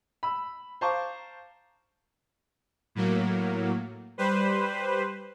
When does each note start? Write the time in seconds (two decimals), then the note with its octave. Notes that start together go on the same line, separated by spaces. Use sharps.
0.23 B5 E6
0.81 C5 F5 A5 A#5 C#6 D6
2.95 A2 F#3 A#3
4.18 G3 B4 C5